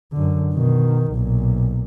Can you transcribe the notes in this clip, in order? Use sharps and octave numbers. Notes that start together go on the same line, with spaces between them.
F#2 D3
B2 D#3
B1 A#2